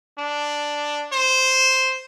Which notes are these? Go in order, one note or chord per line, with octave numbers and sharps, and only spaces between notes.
D4
C5